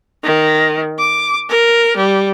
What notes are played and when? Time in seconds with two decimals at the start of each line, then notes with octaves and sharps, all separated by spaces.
0.24 D#3
0.99 D6
1.49 A#4
1.97 G3